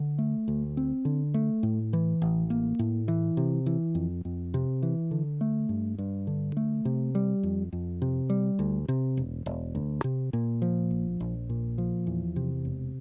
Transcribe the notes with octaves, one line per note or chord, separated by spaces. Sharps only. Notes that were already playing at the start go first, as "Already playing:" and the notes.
Already playing: D3
A3
D2
C4
D3
A3
A2
E3
A1
A#3
A2
E3
C3
E3
F2
F2
C3
E3
D3
A3
G2
G2
D3
A3
C3
G3
F2
F2
C3
G3
D2
C3
E1
E1
D2
C3
A#2
F3
A#1
A#1
A#2
F3
E2
C3
E1